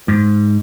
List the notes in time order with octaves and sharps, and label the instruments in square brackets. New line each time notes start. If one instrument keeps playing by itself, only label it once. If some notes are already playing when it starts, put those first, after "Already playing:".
[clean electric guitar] G#2